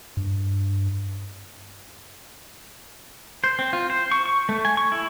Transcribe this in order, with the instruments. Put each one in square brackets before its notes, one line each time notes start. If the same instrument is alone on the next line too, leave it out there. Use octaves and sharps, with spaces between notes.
[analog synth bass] G2
[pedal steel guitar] C5
C4
F4
C5
C#6
C#6
A3
G#5
C#6
E4